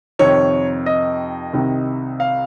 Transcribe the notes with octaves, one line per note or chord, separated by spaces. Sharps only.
F2 C3 D#3 C#5
D#5
C2 C3 D#3
F5